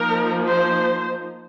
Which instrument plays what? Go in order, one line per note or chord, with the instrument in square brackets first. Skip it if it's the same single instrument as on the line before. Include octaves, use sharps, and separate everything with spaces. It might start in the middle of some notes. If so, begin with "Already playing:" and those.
Already playing: [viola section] F3 A#3 D#4 A#4
C5